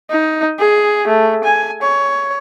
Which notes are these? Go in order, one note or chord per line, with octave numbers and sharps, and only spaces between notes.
D#4
G#4
A3
G#5
C#5